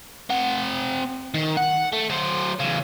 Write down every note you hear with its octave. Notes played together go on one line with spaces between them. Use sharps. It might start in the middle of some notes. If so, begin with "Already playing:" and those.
C4 F#5
D#3
F#5
A3
F#3 C5
E2 C#3